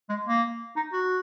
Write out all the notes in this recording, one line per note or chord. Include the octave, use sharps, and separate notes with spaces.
G#3
A#3
D#4
F#4